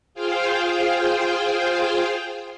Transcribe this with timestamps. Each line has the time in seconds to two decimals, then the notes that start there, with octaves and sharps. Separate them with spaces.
0.14 F4 G#4 C5 F5 G5